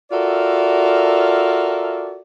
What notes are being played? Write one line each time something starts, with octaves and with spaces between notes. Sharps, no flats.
F4 F#4 A4 A#4 D5 E5